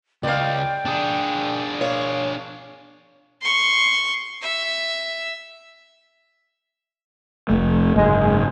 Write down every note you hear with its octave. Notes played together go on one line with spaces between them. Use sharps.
C#2 D5 F5 G5
D4 G#4
C#5 F5
C6 C#6
E5
F1 A3
F#1 G#2 G#3